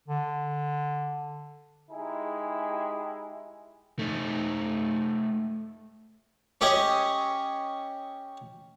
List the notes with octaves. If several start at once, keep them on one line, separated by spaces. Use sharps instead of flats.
D3
G#3 D#4 E4 G4 G#4
A3 D#4
C#4 G4 G#4 C#5 D#5